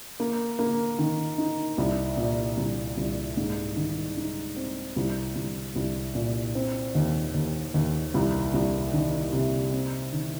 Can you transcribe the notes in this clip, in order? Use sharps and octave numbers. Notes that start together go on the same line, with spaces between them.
A#3
A#3
D#3
D#4
C2
A#2
C2
C2
G#2
D#3
D#4
C4
C2
C2
C2
A#2
C4
D#2
D#2
D#2
C2
C2
D#3
C3
C4
D#3